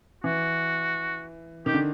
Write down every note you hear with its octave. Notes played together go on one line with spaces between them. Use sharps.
E3 F#4
D#3 G4
D3